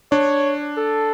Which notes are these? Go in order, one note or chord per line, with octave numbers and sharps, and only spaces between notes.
D4 C#5
A4